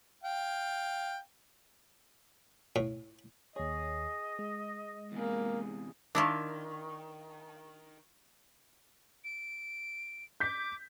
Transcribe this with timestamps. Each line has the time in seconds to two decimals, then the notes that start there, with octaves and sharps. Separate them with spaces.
0.23 F5 G5
2.76 A2
3.56 D#2 G#4 C#5 D#5
4.39 G#3
5.12 E2 C3 A#3 G#4
6.15 D#3 D4 E4 F4
9.24 D7
10.40 D6 G6 B6